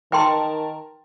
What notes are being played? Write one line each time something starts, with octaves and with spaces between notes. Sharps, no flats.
D#3 A#4 B4 G5 A5 C6